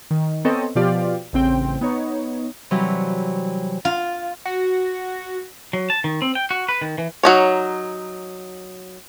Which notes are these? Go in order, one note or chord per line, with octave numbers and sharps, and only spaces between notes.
D#3
B3 C4 A4 C#5 D#5
B2 F3 F4 G4 D5 F5
A1 C#3 C4 G5
B3 D#4 C#5
C3 E3 F#3 G3
F4
F#4
F#3
A5
D#3
C4
G5
F#4
B4
D#3
E3
F#3 D#4 C#5